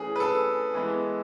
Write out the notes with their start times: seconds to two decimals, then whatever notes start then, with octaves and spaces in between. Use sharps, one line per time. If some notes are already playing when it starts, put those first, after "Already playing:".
Already playing: E3 A3 C#4 G#4
0.16 B4
0.20 A4
0.74 E3 G#3 B3